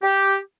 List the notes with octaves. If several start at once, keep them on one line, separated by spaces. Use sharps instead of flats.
G4